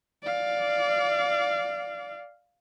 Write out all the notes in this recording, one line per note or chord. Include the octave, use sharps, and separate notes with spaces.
D5 F5